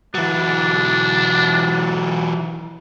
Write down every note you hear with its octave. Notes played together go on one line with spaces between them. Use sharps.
E3 F#3 D4